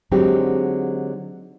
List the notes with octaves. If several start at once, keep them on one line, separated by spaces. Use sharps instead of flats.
D3 F#3 G#3 C4 D#4 G4